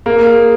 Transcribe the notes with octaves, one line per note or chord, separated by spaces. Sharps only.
A#3 G#4